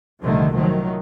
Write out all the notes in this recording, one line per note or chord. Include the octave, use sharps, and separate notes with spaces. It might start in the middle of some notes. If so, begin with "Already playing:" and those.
C2 A#2 D3 D#3 F3 A3
D#3 F3 F#3 A3